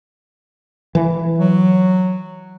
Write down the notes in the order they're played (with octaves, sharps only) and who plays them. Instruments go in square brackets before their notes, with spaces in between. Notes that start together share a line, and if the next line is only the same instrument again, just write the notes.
[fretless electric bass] E3
[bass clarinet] F#3